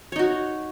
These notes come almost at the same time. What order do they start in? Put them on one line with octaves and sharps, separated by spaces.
C#5 D#4 F#4